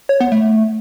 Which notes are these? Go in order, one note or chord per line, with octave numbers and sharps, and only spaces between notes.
C#5
B3
A3